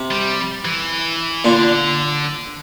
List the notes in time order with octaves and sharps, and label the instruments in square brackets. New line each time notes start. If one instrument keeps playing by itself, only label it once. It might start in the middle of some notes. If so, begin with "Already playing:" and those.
Already playing: [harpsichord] C3
[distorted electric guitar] G3
E3
[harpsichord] A#2 [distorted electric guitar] D3